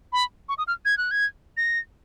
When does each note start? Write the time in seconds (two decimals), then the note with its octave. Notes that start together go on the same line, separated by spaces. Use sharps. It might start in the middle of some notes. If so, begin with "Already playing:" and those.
0.13 B5
0.49 C#6
0.58 D#6
0.67 F6
0.85 G#6
0.98 F#6
1.11 G#6
1.57 A#6